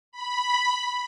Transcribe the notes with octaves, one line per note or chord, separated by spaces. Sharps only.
B5